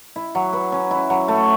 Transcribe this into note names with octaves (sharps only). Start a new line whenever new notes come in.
E4
F#3
B4
C#4
E4
F#3
A3